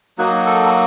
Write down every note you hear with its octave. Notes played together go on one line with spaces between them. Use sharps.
F#3 A#3 D#4 F#4
A4